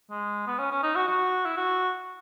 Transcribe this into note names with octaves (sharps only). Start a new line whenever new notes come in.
G#3
B3
C#4
C#4
D#4
F#4
F#4
E4
F#4